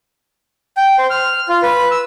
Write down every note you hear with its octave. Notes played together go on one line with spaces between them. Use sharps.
G5
C5
F6
F4
B4
E6